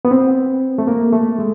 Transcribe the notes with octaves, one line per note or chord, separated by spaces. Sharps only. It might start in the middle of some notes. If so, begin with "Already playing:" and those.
B3
C4
A3
A#3
A3
G#3